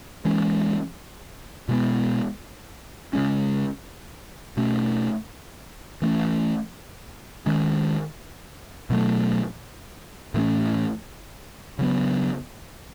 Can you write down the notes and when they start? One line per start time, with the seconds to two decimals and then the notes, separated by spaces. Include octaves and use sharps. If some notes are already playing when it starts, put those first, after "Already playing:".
0.25 E3 G#3 C#4
1.69 B2 G#3 B3
3.13 C#3 G#3 C#4
4.57 B2 A3 C#4
6.02 E3 A3 C#4
7.46 D#3 G#3 C#4
8.90 B2 F#3 A3
10.34 A2 E3 A3 C#4
11.79 C#3 F#3 B3